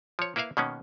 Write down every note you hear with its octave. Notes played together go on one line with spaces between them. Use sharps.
F3 C#5
A#3 E4 B4 E5 F5
B2 D#3 A#3 B3 C#4